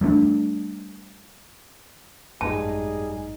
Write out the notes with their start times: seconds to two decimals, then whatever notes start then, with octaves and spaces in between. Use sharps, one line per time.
0.01 G3 A3 C4 D4
2.41 G#1 F#2 A2 G3 D#4 G#4 A5